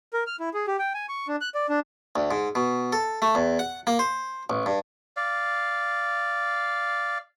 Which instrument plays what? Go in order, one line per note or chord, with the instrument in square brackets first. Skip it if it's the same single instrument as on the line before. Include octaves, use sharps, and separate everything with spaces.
[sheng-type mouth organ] A#4
F6
E4
G#4
G4
G5
G#5
C#6
D4
F#6
D5
D4
[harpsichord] D2
G#2
B2
A4
A3
E2
F#5
A#3
C5
A1
G2
[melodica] D5 F5